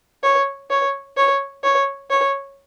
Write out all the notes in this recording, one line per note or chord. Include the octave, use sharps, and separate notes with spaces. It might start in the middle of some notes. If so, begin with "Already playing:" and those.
C#5
C#5
C#5
C#5
C#5